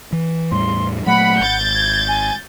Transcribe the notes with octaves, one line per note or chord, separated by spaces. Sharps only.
E3
E2 A2 G3 C6
A#2 F#3 A3 F#5 B5
G#1 G6 A6
G#6
G#5